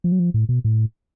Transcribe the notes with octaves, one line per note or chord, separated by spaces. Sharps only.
F3
F#3
F3
A2
B2
A2